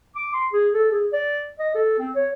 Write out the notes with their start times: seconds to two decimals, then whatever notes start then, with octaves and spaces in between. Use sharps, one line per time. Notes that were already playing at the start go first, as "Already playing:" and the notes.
0.15 D6
0.33 C6
0.52 G#4
0.74 A4
0.91 G#4
1.12 D5
1.59 D#5
1.75 A4
1.98 C4
2.15 C#5